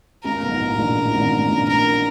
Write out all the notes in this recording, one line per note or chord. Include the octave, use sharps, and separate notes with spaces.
C#2 C#3 A#4
B1 B2
G#2
A1 A2
A#1 A#2
A1 A2
A2
G#1 G#2
A1 A2
A#1 A#2
A#4